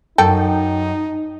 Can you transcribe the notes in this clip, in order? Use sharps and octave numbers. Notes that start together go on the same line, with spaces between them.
F#2 D#4 A4 G5